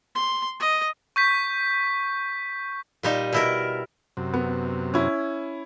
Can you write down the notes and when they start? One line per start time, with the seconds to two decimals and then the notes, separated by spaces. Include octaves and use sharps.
0.15 C6
0.60 D#5
1.16 C#6 G6 B6
3.03 A#2 G3 D#4
3.33 B2 E4 A#4
4.17 F#2 C3
4.34 B3
4.94 C#4 E4